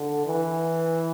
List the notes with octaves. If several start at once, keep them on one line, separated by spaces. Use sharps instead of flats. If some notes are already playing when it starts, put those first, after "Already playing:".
Already playing: D3
E3